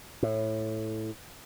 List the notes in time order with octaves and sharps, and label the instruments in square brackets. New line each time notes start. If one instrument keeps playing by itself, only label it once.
[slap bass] A2